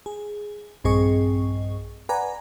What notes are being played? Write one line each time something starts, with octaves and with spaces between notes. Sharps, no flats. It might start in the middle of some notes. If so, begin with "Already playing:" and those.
G#4
A#1 G2 C4 G#4 D#5 C#6
B4 D5 F#5 G#5 A#5